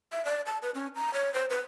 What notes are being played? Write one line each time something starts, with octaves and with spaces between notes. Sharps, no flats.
E5
D5
A5
B4
C#4
A#5
C#5
C5
B4